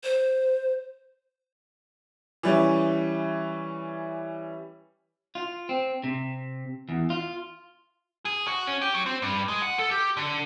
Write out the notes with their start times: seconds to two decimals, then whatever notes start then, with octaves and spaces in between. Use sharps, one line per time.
0.04 C5
2.43 E3 G3 C#4
5.35 F4
5.69 C4
6.04 C3
6.89 E2
7.10 F4
8.25 G#4
8.48 F#4
8.67 C#4
8.82 G4
8.94 F#3
9.06 C4
9.22 G2
9.48 G#3
9.62 F#5
9.79 A4
9.91 G4
10.17 D3